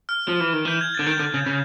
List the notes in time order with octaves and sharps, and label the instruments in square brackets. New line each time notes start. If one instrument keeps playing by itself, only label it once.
[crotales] F6
[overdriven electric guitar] F3
E3
D#3
[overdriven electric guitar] E3 [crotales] G6
[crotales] G#6
A6
[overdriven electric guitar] D3
[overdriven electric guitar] D#3 [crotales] G6
[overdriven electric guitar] D3
C#3
C#3